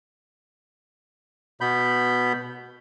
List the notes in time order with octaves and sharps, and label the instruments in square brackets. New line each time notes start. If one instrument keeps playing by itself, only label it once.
[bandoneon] B2 B3 B5 G6